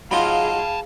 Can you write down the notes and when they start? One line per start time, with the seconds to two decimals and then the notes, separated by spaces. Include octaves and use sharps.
0.11 F#3 D#4 F4 G#4 F5 A5 B5